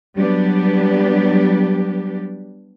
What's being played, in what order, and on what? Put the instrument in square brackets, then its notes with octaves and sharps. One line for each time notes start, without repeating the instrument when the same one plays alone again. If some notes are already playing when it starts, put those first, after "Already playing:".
[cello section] F#3 G3 B3 D4 G4